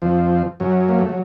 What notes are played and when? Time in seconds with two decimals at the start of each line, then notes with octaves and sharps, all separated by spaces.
0.02 F2 F3
0.60 F#2 F#3
0.89 A#3
0.98 A3
1.09 F#3